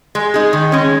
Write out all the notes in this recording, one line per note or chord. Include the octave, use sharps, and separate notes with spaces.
G#3
D#4 G#4
D#3
G#3 C#4